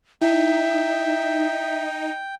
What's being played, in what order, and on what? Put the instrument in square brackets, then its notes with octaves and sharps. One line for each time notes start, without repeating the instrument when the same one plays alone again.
[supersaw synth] D#4 [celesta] E4 [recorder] E5 [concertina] G5